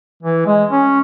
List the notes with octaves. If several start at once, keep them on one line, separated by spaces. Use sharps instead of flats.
E3
G#3
C#4